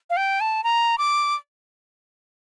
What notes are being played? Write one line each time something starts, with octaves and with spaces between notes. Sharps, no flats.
F5
G5
A5
A#5
D6